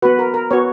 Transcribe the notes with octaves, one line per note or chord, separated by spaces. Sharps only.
B3 F#4 B4
A#4
A#4
B3 F#4 C#5